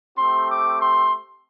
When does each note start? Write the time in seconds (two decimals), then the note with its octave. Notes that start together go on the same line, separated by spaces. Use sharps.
0.17 A3 C4 G4 C6
0.49 D6
0.80 C6